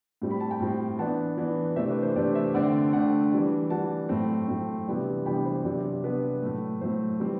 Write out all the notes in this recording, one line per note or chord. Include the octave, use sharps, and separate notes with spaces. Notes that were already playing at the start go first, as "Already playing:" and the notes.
A2 G3 C4
B5
A5
G5 B5
A2 G3 C4
E3 B3 D4 F#5 A5
E3 B3 D4
C3 E3 A3 D4 C5 E5
B4
C5
C3 E3 A3 D4 B4 D5
C5 E5
D3 A3 C4 D5 F#5
D3 A3 C4 D5 F#5
E3 G3 D4
E3 G3 D4 F#5 A5
A2 F#3 A3 C4
A2 F#3 A3 C4
C3 E3 G3 B3 D4
C3 E3 G3 B3 D4 G5 B5
C5
C3 F#3 B3 D4
C3 F#3 B3 D4 B4
A2 F#3 A3
A2 F#3 A3 C5
E3 G3 C4